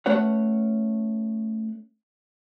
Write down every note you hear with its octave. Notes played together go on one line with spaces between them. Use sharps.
A3 C#4 B4 C#5 F#5